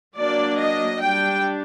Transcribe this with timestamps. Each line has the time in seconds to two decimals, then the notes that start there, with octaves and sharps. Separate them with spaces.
0.17 F#3 A#3 D4 D5
0.59 D#5
1.02 G3 D4 G5